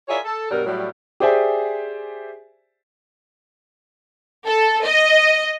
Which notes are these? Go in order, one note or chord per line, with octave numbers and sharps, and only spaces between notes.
F4 G#4 A#4 C#5 D5 E5
A4
G2 B2 F#3 G3 A#4
A2 F#3 G3
G4 G#4 C5 D5 E5 G#5
A4
D#5